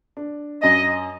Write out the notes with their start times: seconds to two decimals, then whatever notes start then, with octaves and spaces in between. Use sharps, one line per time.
0.17 D4
0.63 F#2 D#5